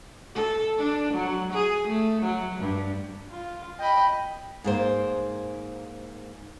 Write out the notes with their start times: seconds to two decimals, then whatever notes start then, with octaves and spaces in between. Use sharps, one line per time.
0.35 A4
0.77 D4
1.13 F#3
1.53 G#4
1.88 A3
2.22 F#3
2.59 G2
3.30 F4
3.80 D#5 G5 B5
4.64 G#2 A#3 C5